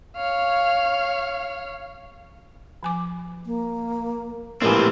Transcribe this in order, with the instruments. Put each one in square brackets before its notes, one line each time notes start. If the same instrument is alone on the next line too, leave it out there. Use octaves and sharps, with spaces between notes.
[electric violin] C#5 F5
[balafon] F3 G#5 D6
[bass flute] A#3
[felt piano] A#1 A2 [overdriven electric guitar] E3 C4 [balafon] G#3 G4 G#5 [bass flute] A#4